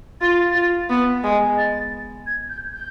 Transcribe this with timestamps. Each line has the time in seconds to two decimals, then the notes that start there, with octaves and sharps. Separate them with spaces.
0.21 F4 A6
0.55 F4
0.90 B3
1.24 G#3
1.58 A6
2.27 G#6
2.50 G6
2.73 G6